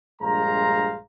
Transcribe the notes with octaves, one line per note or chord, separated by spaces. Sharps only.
A#1 G2 G#3 C5 F5 A#5